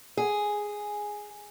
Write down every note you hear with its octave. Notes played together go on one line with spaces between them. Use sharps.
G#4